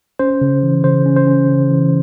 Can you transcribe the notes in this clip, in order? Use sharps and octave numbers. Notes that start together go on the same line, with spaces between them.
C#4 C5
C#3
E3
C#3 C5
C#4
C5
C#4
C#3
E3